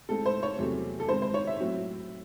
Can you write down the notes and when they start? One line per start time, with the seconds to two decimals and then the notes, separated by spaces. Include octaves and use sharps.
0.09 A2 G#3 C4 A4
0.26 C5
0.43 C#5
0.59 E2 C3 F#3 A3 C4
1.00 A4
1.09 G#2 D#3 G#3 C4 C5
1.22 C5
1.34 C#5
1.47 E5
1.60 A2 F#3 C4